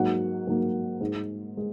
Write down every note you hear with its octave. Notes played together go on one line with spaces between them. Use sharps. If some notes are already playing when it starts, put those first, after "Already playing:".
Already playing: G#2 F#3 A#3 F#5
G#2 F#3 A#3
G#2 G#3
G#3